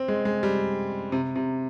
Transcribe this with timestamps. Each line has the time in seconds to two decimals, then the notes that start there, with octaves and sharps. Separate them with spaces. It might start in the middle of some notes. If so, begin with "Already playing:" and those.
Already playing: C4
0.08 G#3
0.25 G#3
0.43 G3
1.12 C3
1.36 C3